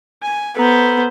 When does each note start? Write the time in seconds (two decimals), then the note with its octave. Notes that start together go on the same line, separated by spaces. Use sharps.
0.23 G#5
0.57 B3 A4 B4 C5 A#5